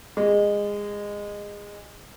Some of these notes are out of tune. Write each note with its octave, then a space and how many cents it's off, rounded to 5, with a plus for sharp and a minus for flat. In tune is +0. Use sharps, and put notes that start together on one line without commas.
G#3 -20